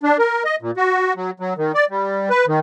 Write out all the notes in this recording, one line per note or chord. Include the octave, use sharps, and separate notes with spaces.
D4
A#4
D#5
A#2
F#4
F#3
F#3
D#3
D5
G3
B4
D#3